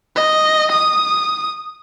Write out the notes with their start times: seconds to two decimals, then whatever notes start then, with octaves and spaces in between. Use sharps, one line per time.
0.16 D#5
0.71 D#6